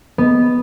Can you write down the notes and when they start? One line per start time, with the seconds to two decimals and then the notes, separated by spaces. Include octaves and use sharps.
0.18 B3